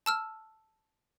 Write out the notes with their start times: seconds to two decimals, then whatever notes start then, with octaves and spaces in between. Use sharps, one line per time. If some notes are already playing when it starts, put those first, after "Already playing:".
0.06 A5 E6 F6